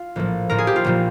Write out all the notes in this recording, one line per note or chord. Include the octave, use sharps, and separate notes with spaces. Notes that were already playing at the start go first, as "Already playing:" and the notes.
Already playing: F4
A#1 A2 F3
A#1 A2 F3 A#4
G#4
G4
F4
A#1 A#2 F3